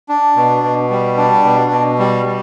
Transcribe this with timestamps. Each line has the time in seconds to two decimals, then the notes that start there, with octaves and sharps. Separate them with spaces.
0.09 D4
0.36 B2
0.64 B2
0.90 G3
1.17 D4
1.44 B2
1.71 B2
1.99 G3
2.26 G3